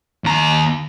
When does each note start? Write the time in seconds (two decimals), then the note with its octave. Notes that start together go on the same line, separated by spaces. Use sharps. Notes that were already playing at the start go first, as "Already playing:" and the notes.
0.24 D#2 A#5